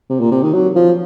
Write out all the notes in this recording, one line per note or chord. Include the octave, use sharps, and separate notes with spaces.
C3
A#2
C3
D#3
F#3
F3